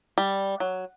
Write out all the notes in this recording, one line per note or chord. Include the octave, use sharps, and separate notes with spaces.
G3
F#3